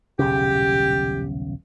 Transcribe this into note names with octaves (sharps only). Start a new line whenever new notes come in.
D#1 B1 C#3 G4